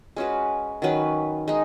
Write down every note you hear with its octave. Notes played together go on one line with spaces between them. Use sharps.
G#3 C#4 F#4 B4
D#3 F#3 C#4 B4
G#3 D#4